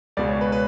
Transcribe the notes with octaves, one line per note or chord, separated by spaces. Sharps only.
C#2 B2 G#3 D5
C#5
B4
B4